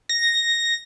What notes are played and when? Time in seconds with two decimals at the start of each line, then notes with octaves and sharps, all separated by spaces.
0.09 A#6